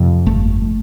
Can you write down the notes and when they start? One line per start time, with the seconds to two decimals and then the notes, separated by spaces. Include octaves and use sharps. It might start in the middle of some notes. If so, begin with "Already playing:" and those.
Already playing: F2 C3
0.26 G1 A3